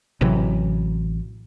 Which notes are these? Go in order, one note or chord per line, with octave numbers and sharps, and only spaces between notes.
A1 C3 E3 F#3